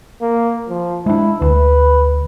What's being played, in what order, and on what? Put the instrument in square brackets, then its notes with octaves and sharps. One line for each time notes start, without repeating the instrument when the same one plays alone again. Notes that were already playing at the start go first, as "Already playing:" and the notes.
[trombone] A#3
F3
[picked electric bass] G#3 D4 [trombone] E4
[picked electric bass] D2 [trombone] B4